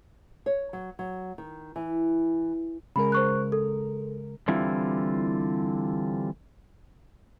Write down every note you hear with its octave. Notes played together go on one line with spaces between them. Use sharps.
C#5
F#3
F#3
D#3
E3
C#3 G#3 A#4 B5
C5 C#6 F#6
A4
D3 E3 G3 C4 E4 F4